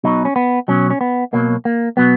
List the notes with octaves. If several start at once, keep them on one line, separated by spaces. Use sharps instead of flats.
B1 B2 F#3 D#4
C#4
B3
B1 B2 F#3 C#4
C#4
B3
B1 B2 F#3 A#3
A#3
B2 F#3 B3